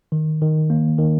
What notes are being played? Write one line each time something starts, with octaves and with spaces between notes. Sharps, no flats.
D#3
D#3
A#3
D#3